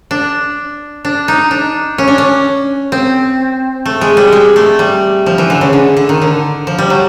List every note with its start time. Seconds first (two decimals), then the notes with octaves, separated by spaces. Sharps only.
0.11 D4
1.05 D4
1.28 D#4
1.51 D4
1.98 C#4
2.08 D4
2.18 C#4
2.92 C4
3.86 A3
4.01 G#3
4.17 G3
4.33 G#3
4.56 A3
4.79 G3
5.26 F3
5.38 E3
5.50 D3
5.61 C#3
5.73 D3
5.97 D3
6.09 D#3
6.22 D3
6.67 F3
6.78 G3
6.90 F#3